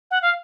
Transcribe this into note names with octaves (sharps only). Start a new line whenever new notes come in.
F#5
F5